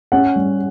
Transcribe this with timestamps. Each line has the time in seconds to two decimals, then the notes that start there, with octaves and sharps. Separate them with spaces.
0.12 C#4 F#5
0.36 G3